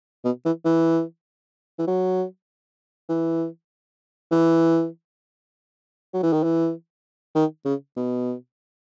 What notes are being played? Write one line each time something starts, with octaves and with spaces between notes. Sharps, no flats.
B2
E3
E3
E3
F#3
E3
E3
F#3
E3
D#3
E3
D#3
C#3
B2